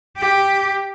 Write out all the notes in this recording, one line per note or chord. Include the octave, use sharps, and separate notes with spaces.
G4